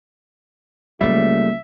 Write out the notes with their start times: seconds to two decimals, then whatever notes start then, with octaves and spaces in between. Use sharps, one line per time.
1.01 C#2 F#3 G3 A3 A#3 E5